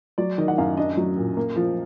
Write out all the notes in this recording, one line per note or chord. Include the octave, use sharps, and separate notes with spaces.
F#3 D5
D#3 D#5
F#5
F#2 F5
D4 D#5
F#3
A#2
A#3
F3